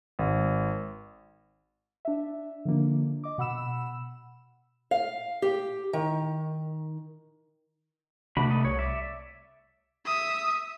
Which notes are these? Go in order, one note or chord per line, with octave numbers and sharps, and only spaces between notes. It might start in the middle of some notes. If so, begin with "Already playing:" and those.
G#1
D4 E5
D3 F3 A#3 D4
D#5 D6
B2 F#5 B5 E6 E7
F5
G4
D#3
C3 A3 D4 F#4 B5
A4 D#5
C2 C#5
D5 E5
E5 D#6